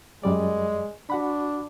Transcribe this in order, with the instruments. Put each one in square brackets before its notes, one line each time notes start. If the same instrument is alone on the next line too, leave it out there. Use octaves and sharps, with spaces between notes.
[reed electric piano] F#2 G3 D5 [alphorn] G#3
[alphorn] D4 [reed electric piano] F#4 F#5 B5